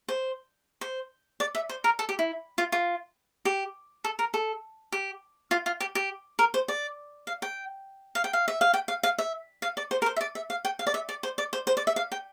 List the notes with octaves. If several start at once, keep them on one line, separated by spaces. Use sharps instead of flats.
C5
C5
D5
E5
C5
A#4
A4
G4
E4
F4
F4
G4
A4
A#4
A4
G4
F4
F4
G4
G4
A#4
C5
D5
F5
G5
F5
G5
F5
E5
F5
G5
F5
F5
E5
F5
D5
C5
A#4
C5
E5
D5
E5
F5
G5
F5
D5
E5
D5
C5
D5
C5
C5
D5
E5
F5
G5